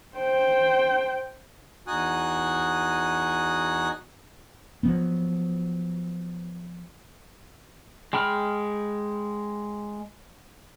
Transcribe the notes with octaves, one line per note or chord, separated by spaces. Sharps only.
C5 G5
E2 D#4 F#4 G#5 D#6 F#6
F3 F#3 B3
G#3 G5 B5 F6